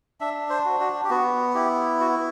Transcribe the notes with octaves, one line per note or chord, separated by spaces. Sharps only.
D4 E5
C5
F#4
F#4
G4
B3 F#4
E4 G4
F#4